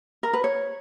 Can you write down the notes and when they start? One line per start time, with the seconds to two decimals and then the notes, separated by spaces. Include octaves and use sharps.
0.23 A#4
0.33 B4
0.44 C#5